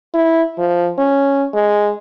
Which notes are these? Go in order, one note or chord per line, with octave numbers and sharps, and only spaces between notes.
E4
F3
C#4
G#3